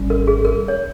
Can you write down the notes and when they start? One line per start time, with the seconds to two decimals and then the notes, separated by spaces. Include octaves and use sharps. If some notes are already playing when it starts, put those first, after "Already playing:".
Already playing: G#1 G3 C#4
0.10 A#4
0.28 G#4
0.45 A#4
0.68 C#5